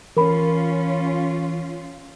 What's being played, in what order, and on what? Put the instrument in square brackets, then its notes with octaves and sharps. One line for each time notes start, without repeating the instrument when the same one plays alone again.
[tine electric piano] E3 [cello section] C#4 F4 [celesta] A#4 B5